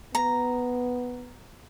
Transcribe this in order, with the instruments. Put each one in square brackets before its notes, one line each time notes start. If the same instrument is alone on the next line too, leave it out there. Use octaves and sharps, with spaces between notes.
[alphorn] B3 [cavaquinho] A#5